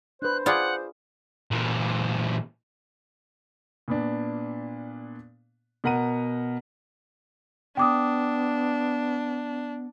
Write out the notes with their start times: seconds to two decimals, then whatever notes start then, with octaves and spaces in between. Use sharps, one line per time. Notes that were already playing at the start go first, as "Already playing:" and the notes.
0.22 D4 B4 C5 F#6
0.46 F4 G#4 D5 F#5 B5
1.51 A#2 E3
3.88 A#2 B3 D4
5.84 B2 A#4 F#5 A#5 D#7
7.77 B3 D4 G5 D6 D#6